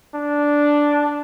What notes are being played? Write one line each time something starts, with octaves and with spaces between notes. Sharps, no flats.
D4